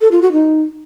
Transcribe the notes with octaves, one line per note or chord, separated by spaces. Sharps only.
A4
F4
F#4
D#4